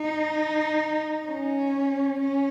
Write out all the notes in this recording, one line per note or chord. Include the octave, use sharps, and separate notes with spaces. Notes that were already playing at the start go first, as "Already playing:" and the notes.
Already playing: D#4
C#4
C#4